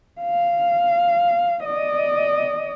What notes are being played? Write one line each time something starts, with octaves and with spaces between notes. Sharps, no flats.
F5
D5 D#5